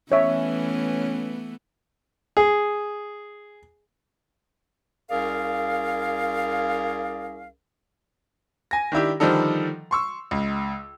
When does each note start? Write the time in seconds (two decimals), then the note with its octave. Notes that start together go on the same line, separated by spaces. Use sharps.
0.12 E3 A3 B3 C#4 C#5 E5
2.37 G#4
5.10 C2 C#4 G#4 A#4 D5 F5
8.71 G#5 A#6
8.92 D#3 D4 E4 G4
9.20 D3 D#3 F3 G3 D#4 A4
9.91 C6 C#6 E6
10.31 C#2